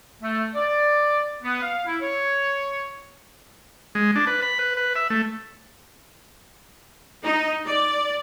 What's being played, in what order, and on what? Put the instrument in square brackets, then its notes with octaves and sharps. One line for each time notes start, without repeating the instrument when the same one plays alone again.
[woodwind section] A3
D5
B3
F5
E4
C#5
[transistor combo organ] G#3
D4
B4
B5
B4
B4
E5
A3
[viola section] D#4
D5